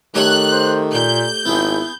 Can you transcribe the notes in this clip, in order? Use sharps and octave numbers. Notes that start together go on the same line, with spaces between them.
D#3 A3 G4 C#5 F#6
C5
A#2 G6
G#1 B3 E4 G#4